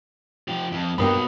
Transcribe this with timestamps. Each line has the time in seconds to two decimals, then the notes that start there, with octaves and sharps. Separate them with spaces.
0.48 F3 G4
0.72 F2
0.98 G2 F#3 A#3 B3 G4 B5 D#6